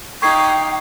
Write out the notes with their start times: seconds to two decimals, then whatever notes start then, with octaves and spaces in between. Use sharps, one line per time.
0.22 D#4 F5 G5 C#6 G#6 C7